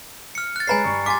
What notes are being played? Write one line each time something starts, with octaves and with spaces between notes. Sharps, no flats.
F6 C#7
F#6 A6
G#3 B4 C#5 G#5 A#5 C7
G2 G3 C#6
G#5 C6 D6 A6 B6